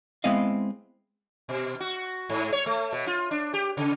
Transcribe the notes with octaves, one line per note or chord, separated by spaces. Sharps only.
G#3 B3 C4 E4 D#5 F5
B2
F#4
G#2
C#5
A3
B2
F4
D4
G4
C#3